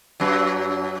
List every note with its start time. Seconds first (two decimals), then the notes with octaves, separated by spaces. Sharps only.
0.20 F#2 F#3